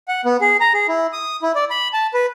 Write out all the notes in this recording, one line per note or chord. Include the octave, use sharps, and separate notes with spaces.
F#5
B3
G#4
A#5
G#4
E4
D#6
E4
D5
B5
A5
B4